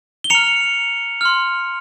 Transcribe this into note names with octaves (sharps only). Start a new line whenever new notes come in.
G7
A#5 F6 C#7 F7
C6 F6